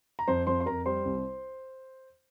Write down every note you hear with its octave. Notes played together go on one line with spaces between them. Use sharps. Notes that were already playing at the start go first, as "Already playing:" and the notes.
A#5
F2 C5 C6
F2 C5 C6
C6
F2 A#4 A#5
G3 C5 C6
C2